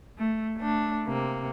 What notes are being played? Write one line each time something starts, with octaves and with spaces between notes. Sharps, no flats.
A3
A3 D4
C3 A#3